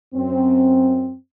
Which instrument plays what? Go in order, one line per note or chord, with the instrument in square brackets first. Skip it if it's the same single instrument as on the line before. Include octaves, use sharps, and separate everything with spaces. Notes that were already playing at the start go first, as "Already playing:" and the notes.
[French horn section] F#2 C4